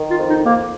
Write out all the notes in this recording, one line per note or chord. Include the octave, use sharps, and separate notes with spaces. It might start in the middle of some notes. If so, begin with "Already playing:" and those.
Already playing: D#3
F4
F2
D#4
F2 A#3